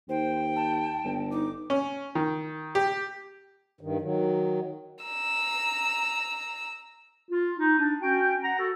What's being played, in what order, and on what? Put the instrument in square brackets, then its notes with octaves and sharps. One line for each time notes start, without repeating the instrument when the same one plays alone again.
[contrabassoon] D#2 [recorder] C5 [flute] G5
[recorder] A5
[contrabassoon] G1
[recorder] D#4 [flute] D6
[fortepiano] C#4
D#3
G4
[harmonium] G2 D#3
D#3 F#3
[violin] A#5 E6
[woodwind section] F4
D#4
D4
C#4 F#4 G5
F#5 A#5
F#4 A4